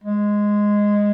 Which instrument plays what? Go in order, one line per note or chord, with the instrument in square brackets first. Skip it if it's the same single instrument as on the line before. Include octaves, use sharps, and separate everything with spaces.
[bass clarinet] G#3